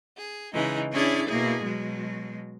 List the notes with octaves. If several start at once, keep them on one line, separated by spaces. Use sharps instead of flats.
G#4
C#3 E3 G#3 D#4
C#4 D4 E4 G#4 C#5 D5
B2 A#3 E4 G#4
B2 F#3 G#3